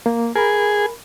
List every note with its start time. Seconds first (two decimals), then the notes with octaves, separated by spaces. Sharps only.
0.06 A#3
0.36 G#4 A#4 B5